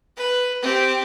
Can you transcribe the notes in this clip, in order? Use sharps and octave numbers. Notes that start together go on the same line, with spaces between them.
B4
C4 G4